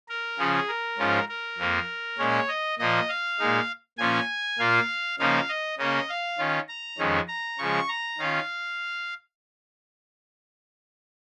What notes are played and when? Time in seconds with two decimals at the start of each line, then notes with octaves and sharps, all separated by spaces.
0.09 A#4
0.39 C#3 F3 C#4 G#4
0.68 A#4
0.99 G#2 F3 C#4 F4
1.29 A#4
1.58 F2 F3 A#3
2.18 A#2 G#3 C#4 C#5
2.48 D#5
2.79 A#2 F3 A#3 D#5
3.09 F5
3.39 A#2 G#3 D#4
3.98 A#2 F3 C#4 F4 G#5
4.59 A#2 A#3 F4 F5
5.19 C#3 F3 A#3 D#4 F5
5.49 D#5
5.78 C#3 A#3 C#4 D#5
6.09 F5
6.39 D#3 C#4 F4
6.69 A#5
6.98 F2 D#3 G#3 C#4
7.28 A#5
7.58 C#3 F3 G#3 C#6
7.89 A#5
8.19 D#3 C#4 F4 F5